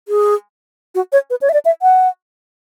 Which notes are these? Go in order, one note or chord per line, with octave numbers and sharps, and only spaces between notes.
G#4
F#4
C#5
B4
C#5
E5
D5
E5
F#5